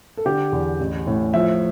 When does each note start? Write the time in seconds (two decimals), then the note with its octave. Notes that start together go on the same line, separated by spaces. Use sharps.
0.17 A4
0.25 D3 G4
0.52 E2
0.80 A1
1.07 A2
1.34 F3 E5